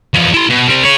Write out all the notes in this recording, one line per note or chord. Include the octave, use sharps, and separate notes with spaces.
E2 F3
E4 C6
B2
G3 C4
G#4 C#5